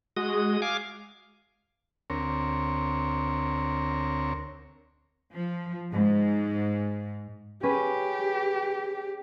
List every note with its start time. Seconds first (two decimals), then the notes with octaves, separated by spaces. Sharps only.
0.17 G#3 F#4 D#6
0.62 F5 G#5 D6
2.10 D2 C4 A#4 C#5
5.32 F3
5.91 G#2
7.63 C#4 G4 G#4 B4